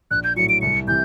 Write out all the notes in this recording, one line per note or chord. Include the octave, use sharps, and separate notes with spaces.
A#1 F#6
G6
A2 F#3 C#7
D7
C2 C#7
C3 E3 G6